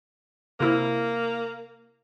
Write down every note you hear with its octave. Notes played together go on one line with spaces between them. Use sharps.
C3 A#3 E4